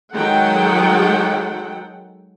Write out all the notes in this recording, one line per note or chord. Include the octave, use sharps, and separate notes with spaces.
D#3 F#3 G#3 A4 F#5 G5